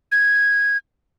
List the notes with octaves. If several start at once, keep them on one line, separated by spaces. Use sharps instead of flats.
G#6